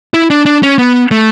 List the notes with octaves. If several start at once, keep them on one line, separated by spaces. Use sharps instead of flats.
E4
D4
D4
C#4
B3
A3